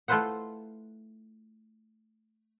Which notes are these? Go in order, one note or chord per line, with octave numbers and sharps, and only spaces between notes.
A3 E4 F4 B4 C5 F#5